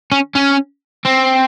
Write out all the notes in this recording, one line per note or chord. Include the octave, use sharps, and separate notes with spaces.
C#4
C#4
C4